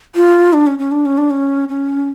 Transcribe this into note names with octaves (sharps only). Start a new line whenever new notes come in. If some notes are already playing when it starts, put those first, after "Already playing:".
F4
D4
C#4
C#4
D4
C#4
D4
C#4
C#4